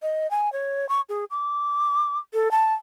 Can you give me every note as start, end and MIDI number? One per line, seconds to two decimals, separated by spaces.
0.02 0.30 75
0.31 0.52 80
0.53 0.89 73
0.89 1.01 85
1.09 1.25 68
1.31 2.18 86
2.33 2.51 69
2.51 2.74 81